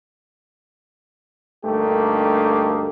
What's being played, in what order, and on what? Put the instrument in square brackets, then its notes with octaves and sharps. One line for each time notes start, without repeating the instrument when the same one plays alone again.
[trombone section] D2 G2 A3 A#3 D#4 G4